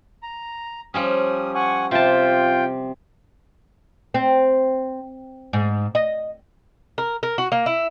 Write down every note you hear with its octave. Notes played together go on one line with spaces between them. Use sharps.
A#5
F3 G3 C#4 D#6
F#5 G#5 C#6
C3 F4 G5 A5
C4
G#2
D#5
A#4
A#4
F#4
A#3
E4